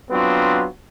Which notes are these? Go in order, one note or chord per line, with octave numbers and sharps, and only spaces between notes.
F#3 B3 C4 D4 F4